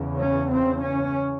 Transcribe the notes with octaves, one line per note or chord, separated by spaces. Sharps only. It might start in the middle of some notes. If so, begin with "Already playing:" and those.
Already playing: E2 C#3
C#4
C4
C#4